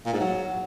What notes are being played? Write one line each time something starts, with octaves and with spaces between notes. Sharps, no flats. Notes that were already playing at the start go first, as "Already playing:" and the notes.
A#2
G#2
F#3